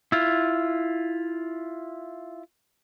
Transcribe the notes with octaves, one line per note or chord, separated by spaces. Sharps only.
E4 F4